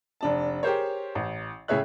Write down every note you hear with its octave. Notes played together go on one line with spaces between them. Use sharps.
F1 D4 A5
G4 G#4 A#4 C5 C#5
A1
A2 C#3 G#4 C#5 E5 F#6